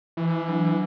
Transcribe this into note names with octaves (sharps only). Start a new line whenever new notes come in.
E3
F#3 D4